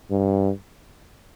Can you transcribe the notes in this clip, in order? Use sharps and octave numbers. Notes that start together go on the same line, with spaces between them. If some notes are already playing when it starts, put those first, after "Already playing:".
G2